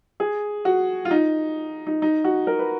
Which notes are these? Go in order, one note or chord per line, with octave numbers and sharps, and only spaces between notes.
G#4
F#4
F4
D#4
D#4
D#4
F#4
A#4
B4